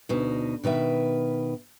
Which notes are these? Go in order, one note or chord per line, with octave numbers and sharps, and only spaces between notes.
D2 B2 D#4
B2 D#3 B4 E5